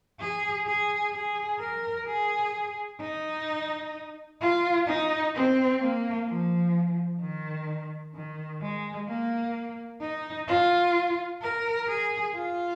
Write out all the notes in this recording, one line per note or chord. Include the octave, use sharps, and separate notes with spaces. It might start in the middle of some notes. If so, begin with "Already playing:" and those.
G#4
G#4
G#4
A#4
G#4
D#4
F4
D#4
C4
A#3
F3
D#3
D#3
G#3
A#3
D#4
F4
A#4
G#4
F4